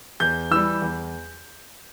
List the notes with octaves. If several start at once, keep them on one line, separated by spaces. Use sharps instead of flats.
E2 G6
E3 G3 E6
E2